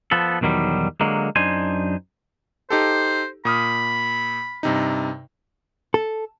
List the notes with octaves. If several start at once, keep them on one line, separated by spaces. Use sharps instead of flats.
F3 B3 A4
B1 E2 D#3 F#3 G3
D3 F#3 G#3 A#3
F#2 D4 D#4 C5 G#5
D#4 G4 A4 C5
A#2 B5 D#6 F6
G2 C3 D#4
A4